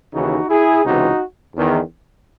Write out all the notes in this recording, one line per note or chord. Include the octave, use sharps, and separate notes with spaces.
D#2 C#3 E3 D#4 F#4
E4 G#4
C#2 C3 E3 D#4 F#4
E2 D#3